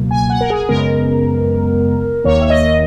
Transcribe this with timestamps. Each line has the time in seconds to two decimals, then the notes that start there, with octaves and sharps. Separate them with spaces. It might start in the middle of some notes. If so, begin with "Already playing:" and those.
Already playing: C#2 B2 F#3 A#3
0.11 G#5
0.30 F#5
0.41 A#4
0.50 G#4
0.69 F#2 C#3 G#3 B3 A#4
2.24 D#2 D#3 A#3 C#5
2.41 E5
2.50 D#5